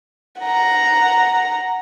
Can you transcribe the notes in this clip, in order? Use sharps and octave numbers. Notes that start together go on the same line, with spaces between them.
F#5 A#5